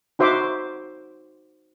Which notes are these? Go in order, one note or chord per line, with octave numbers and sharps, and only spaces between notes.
D#4 F#4 C5 E5 C6 D6